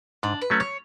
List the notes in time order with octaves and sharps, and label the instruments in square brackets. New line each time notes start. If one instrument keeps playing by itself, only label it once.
[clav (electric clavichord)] G#2 [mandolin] D4
[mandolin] B4
[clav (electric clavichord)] F#3 A3 C#4
[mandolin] C#5